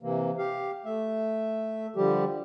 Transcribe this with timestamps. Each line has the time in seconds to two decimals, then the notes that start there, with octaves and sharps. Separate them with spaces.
0.03 C3 E3 A#3
0.38 G4 F5
0.85 A3 E5
1.96 D3 F3 G3 G4